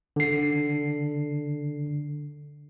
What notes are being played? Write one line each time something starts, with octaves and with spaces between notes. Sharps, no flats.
D3 C7